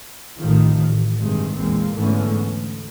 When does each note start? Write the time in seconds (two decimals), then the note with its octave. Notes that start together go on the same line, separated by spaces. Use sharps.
0.40 A1 D2 A2 C3 D#3 F3
0.86 A1
1.18 G2 C3 D#3 G#3
1.54 A#1 E2 G#3 A#3 C4
1.95 G#2 D3 E3 A3 B3 C#4
2.46 D2